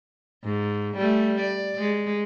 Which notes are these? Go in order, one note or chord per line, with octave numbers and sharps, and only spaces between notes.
G#2
G3 A3
D5
G#3